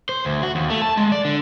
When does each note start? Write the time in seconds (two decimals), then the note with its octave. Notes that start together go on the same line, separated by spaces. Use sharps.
0.09 C5
0.25 D2
0.43 F#4
0.55 D#2
0.70 A3
0.82 A5
0.97 G#3
1.12 D5
1.25 D3